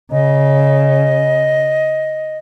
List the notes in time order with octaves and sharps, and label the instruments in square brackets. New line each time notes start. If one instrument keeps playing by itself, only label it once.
[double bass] C#3 [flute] D#5